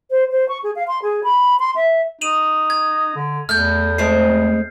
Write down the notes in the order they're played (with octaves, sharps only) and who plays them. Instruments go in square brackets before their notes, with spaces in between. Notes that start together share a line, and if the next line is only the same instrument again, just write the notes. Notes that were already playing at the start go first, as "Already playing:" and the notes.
[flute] C5
C5
C#6
G#4
F5
C6
G#4
B5
C6
E5
[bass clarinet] D#4 [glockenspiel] D#7 F7 F#7
[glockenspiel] G#6
[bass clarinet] D3
[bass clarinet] E2 [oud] A3 [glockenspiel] F6 G6
[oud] G#3 A3 C4 [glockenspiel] C7